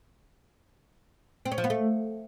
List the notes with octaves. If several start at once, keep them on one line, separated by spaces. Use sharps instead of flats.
C4
C#4
F3
B3
A3